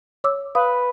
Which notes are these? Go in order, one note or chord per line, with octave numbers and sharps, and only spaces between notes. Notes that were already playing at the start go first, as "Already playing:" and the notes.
C#5 D6 E6
B4 F5 D#6